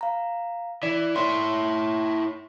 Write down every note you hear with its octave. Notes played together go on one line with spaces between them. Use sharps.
F5 A#5
E3 D5
E4 C#5 C6